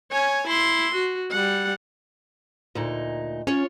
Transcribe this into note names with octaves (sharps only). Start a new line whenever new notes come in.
C#5 G#5
E4 C6
F#4
G3 F#5
D2 A#2 D#4
C#4 F4 C#5